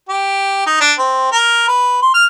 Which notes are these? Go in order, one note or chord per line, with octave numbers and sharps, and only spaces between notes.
G4
D#4
D4
C4
A#4
B4
C6
F6